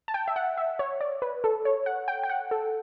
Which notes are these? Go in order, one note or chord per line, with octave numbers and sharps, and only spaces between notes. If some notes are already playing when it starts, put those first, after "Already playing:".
A5
G5
E5
F#5
E5
C#5
D5
B4
A4
C#5
F#5
G5
G5
F#5
A4